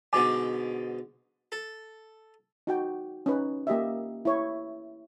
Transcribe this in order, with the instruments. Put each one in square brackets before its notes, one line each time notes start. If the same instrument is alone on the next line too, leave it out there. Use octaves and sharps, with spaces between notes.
[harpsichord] G#2 B2 D3 [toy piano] G#5 D6
[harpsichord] A4
[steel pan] D#4 F#4 G5
C#4 D#4 B4
A#3 G4 D#5 E5
E4 C#5